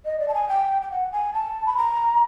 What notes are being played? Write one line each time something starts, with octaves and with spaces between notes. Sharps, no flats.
D#5
D5
A5
G#5
G5
G5
F#5
G#5
A5
B5
A#5